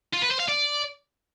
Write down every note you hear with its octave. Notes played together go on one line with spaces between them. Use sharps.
F4
B4
C5
F5
D5